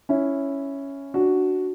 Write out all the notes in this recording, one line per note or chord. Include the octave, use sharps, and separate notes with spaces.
C#4 E4
D4 F#4